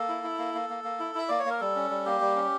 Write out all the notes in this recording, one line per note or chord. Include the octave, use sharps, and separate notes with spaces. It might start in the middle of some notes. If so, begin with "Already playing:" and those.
Already playing: A#3 A4
E4
E4
A#3
A#3
A#3
A#3
E4
E4 E5
A#3 D5
C#5
A#3 A#4
G3 A4
C#4
G3
A#3 G4
G3
C#4